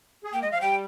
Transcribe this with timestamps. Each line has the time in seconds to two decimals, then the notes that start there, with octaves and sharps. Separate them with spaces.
0.24 G#4
0.33 A#3 G5
0.42 G#3 D#5
0.52 F3 F5
0.61 G3 G5